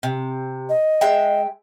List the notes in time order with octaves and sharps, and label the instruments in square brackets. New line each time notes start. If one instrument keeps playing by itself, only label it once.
[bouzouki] C3
[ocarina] D#5
[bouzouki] G#3 E5 G5